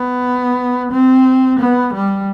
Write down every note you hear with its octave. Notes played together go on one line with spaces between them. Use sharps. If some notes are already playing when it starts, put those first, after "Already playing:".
Already playing: B3
C4
B3
G3